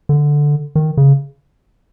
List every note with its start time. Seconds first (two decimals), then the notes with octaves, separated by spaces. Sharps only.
0.09 D3
0.75 D#3
0.97 C#3